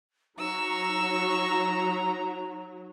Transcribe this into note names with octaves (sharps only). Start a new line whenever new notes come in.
F#3 D#4 A#5 C#6 E6